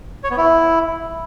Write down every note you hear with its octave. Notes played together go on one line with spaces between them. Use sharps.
C#5
B3
E4